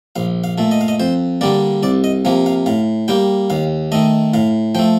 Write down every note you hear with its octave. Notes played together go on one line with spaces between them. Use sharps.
A#1 F5
F5
A#2 A3
D#5
F5
D#5
F2 C5
D3 G3 A#3 D5
C2 D5
D#5
C3 F3 A#3 F5
F5
A2 F5
G3 A#3 G5
D#2 F5
D#3 A3 D#5
A2 F5
F3 A3 G5